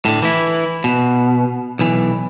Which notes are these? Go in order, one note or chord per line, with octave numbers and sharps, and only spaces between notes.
A2 D3
E3 E4
B2
B1 E3